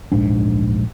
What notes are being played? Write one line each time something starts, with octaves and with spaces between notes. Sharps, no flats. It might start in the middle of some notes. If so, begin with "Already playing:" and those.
D1 A#1 G#2 D4